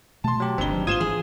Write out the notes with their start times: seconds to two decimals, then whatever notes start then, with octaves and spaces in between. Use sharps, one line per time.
0.24 B2 A3 A5 C6
0.40 F#3 G4
0.58 G1 D2 G2 D#3 G3 C4 G7
0.73 F#3
0.87 G#1 F4 C5 D#6 G#6 D#7 E7 G7
1.00 E3 G#4